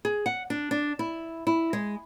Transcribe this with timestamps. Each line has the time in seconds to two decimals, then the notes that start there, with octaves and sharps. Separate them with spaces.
0.05 G#4
0.26 F#5
0.50 D4
0.71 D4
0.99 E4
1.47 E4
1.73 G#3